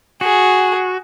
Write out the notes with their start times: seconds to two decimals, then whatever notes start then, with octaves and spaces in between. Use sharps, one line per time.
0.21 F#4 G#4